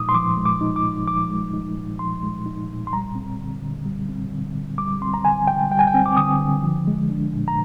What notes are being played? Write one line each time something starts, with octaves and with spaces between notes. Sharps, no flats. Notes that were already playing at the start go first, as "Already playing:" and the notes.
Already playing: A#2 F3 G#3 D#4 D6 D#6
C6
F3 D6
G#3
D6
D#4
D6
A#2
F3 D6
G#3
D#4
A#2
F3 C6
G#3
D#4
A#2
C6
G3 A#5
C4
D3
D3
G3
C4
D3
D3
G3 D6
C4 C6
A#5
D3 G#5
D3 G5
G3 G5
G#5
G5
C4
D6
D3 D#6
D3
F3
G#3
D4
A#2
A#5